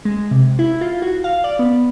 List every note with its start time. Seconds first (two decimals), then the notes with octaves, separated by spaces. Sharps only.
0.05 G#3
0.31 C3
0.59 E4
0.81 F4
1.02 F#4
1.24 F5
1.44 D5
1.59 B3